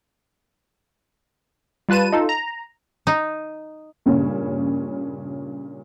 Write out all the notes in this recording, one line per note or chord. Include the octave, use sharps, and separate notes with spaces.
G3 F4 B4 A5 D#7
D#4 F4 A4
A#5
D#4
G2 A#2 C#3 C#4